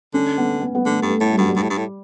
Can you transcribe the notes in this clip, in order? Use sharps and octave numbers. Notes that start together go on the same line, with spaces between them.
D3 C#4
B3
B3
B3
D3 A3
G2
A3
A2
G3
G2 F#3
G3
G2
A2
G2
A2